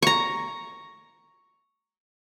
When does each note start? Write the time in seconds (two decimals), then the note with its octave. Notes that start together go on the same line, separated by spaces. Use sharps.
0.02 A#5 C#6